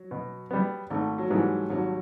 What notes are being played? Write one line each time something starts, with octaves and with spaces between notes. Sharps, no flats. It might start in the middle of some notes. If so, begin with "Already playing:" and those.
Already playing: F#3
B2
G3 B3
G#1 A3
F#3
G#2 E3 G3
G#1 F#3